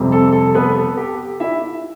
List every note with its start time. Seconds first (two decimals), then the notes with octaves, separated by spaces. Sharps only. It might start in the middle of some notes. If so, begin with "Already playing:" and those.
Already playing: F2 C3 G3 C4
0.12 A4
0.32 A4
0.54 B3 B4
0.76 A4
0.97 G4
1.40 E4 E5